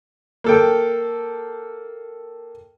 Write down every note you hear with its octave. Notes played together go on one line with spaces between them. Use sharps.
A#3 A4 G5